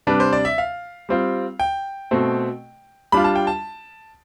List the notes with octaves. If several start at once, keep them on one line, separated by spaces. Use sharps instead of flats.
C3 G3 D4 B4
C5
D5
E5
F5
G3 C4 F4
G5
B2 A3 C4
G3 D4 F4 B5
A5
G5
A5